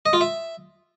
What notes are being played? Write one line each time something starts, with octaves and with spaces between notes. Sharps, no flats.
D#5
F4
E5